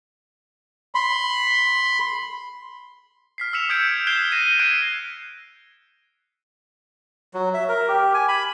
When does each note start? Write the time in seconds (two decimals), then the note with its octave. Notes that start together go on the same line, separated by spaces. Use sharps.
0.95 B5 C6
3.38 F6 B6 C7
3.53 E6 F6 B6 C#7 E7 F7
3.69 D#6 E6 G6 G#6 C#7 D7
4.07 F#6 G#6 C7 D7 E7 G7
4.32 F#6 A#6 C7 D#7 G7
4.60 F#6 G#6 C7 D7 D#7 G7
7.34 F#3
7.54 E5
7.69 A#4
7.88 G4
8.14 G#5
8.28 B5